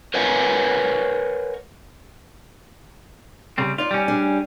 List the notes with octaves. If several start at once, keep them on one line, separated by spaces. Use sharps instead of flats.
A#4 B4 C#5 D#5 F#5 G#5
C#3 G3 C4
D#4 F4 D5
G3 C#4
D4 G#4